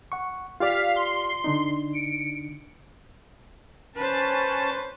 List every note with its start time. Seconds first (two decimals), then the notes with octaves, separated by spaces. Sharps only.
0.12 F#5 C#6
0.60 F4 G4 D5 F5 B6
0.96 C6
1.44 D3 D4 D#4
1.93 C#7 D7
3.96 C#4 B4 C5 A5